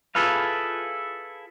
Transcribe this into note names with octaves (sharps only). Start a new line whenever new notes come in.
E4 F4 G#4 A4 B4 F5